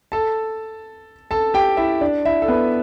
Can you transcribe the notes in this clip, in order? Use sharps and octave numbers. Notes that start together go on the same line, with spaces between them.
A4 A5
A4 A5
G4 G5
E4 E5
D4 D5
E4 E5
A4
B3 B4